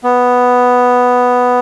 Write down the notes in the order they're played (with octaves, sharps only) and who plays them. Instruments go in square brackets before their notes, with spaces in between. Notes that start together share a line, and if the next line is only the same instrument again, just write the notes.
[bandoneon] B3